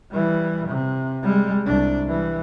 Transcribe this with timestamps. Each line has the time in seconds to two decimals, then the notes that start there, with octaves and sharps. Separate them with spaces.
0.11 E3 G3
0.68 C3
1.23 G3 G#3
1.66 C2 D4
2.08 E3 G3